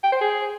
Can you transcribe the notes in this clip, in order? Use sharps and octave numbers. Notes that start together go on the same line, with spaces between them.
G5
C5
G#4